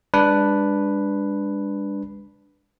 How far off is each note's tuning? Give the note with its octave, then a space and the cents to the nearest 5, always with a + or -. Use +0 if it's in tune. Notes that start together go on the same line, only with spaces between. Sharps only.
G#3 -45 D4 +0 B4 +0